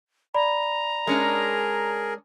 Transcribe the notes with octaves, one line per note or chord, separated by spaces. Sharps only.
D5 A#5 B5
G#3 C#4 D4 G#4 A#4